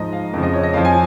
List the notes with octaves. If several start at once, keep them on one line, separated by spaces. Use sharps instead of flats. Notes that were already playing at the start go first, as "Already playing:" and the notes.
Already playing: G#2 F3 D#5
F5
F2 C#3 F3
D#5
C#5
D#5
F2 F3 F5
G#5